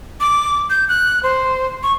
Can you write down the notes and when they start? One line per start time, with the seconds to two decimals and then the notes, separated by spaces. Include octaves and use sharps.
0.20 D6
0.70 G6
0.89 F#6
1.23 C5
1.83 C#6